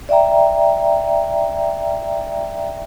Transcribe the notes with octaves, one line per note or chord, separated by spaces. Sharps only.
D5 E5 G5 A#5